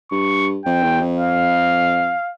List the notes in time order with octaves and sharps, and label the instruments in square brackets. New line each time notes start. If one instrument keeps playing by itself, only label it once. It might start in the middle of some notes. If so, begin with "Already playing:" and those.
[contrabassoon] G2 [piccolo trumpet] C#6
[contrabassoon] F2 [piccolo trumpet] G5
[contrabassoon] E2
F2
[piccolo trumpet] F5